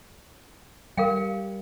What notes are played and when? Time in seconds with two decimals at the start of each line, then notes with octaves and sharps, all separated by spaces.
0.97 G3 A#4 F5 G5